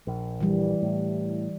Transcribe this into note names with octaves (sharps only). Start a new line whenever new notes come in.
A#1
E3 G3
A2